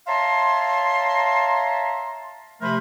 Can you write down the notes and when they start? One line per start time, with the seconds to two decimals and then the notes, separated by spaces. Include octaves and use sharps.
0.07 C#5 E5 F5 A5 A#5 C6
2.62 C3 F3 A3 A#4 C5 B5